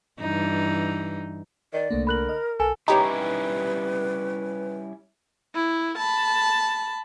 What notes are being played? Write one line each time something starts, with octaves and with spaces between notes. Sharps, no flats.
G2 E3 D#4
D#3 D5
C2 D3 A3 A#3
A#4 B5 F#6 F#7
D#5 F6
B1 A4 G#5
G3 C#4 D#4 E4 G4 B4 C#5 A#5
E4
A5 B5